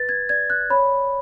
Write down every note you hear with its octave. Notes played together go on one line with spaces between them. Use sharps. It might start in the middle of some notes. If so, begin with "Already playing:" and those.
Already playing: B4 A6
G#6
D5 G#6
F#6
C#5 B5